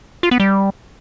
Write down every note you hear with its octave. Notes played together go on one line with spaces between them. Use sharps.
F4
B3
G3